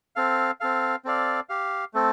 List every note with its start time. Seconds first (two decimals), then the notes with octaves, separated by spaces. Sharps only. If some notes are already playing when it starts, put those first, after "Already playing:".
0.16 C4 A4 F5
0.60 C4 A4 F5
1.05 C4 A4 D5 F5
1.49 G4 F5
1.94 A3 C4 A4